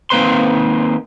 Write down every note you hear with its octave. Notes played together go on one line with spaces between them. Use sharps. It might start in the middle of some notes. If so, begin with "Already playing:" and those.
D#3 A#3 C4 B4 C5 C6